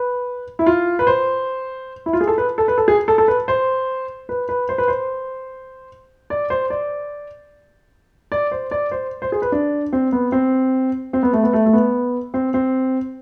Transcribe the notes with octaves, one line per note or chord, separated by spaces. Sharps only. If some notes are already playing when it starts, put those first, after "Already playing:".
Already playing: B4
E4
F4
B4
C5
E4
F4
G#4
A4
B4
A4
B4
A4
G#4
A4
A4
B4
C5
B4
B4
C5
B4
C5
D5
C5
D5
D5
C5
D5
C5
C5
G#4
B4
D4
C4
B3
C4
C4
B3
A3
B3
A3
A3
B3
C4
C4